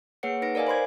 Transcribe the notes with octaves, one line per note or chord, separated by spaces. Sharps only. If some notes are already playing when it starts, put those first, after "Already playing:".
A#3 G#4 B4 C#5 F#5 C#7
D#4 B4 A#6 D7
A#4 D5 D#5 F5 G#5
C5 B5 C6 G#6